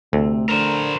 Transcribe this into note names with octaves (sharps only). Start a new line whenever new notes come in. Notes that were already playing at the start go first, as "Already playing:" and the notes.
D2 C3 A3
D3 A#4 C5